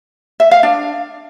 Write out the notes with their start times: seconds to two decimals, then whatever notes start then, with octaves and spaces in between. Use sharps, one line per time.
0.40 E5
0.51 F5
0.63 D4